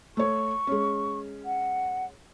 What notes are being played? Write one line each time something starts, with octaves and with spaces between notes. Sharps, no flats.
A3 C#5 C#6
G#3 C#4
F#5